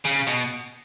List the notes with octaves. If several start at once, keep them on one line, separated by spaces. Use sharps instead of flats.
C#3
B2